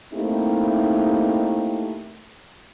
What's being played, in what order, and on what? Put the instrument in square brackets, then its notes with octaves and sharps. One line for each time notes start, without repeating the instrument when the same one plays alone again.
[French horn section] A3 A#3 C4 D#4 E4 G4